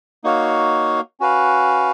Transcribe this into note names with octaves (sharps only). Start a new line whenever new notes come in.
A#3 D#4 F#4 C#5 F5
C#4 F#4 B4 F5